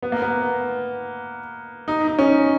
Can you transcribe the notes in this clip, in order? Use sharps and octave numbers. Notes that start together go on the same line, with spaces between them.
B3
A#3
B3
D#4
D#4
C#4